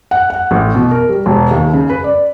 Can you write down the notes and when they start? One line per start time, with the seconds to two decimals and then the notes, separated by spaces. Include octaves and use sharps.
0.11 F#5
0.30 F#5
0.51 A1
0.75 B2
0.91 A#4
1.09 G3
1.26 E1
1.51 D#2
1.73 C#3
1.90 B4
2.04 D5